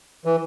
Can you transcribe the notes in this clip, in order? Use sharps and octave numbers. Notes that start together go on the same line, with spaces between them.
E3